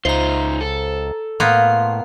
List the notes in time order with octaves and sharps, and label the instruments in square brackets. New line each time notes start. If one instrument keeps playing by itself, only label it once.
[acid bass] C#2 [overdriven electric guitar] D#4 F4 [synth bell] C5 A#5
[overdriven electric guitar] A4
[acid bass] A2 [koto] A#3 B3 [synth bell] F5 C6